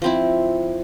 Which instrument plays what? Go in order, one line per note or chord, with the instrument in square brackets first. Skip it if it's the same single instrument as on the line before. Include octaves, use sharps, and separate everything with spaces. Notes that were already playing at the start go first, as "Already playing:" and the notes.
[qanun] F3 C4 E4